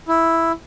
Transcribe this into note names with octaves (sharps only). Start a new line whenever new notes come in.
E4